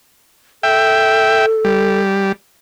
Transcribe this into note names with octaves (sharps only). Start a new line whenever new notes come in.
A4 E5 G5
G3